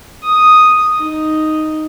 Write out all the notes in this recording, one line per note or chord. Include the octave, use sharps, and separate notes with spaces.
D#6
D#4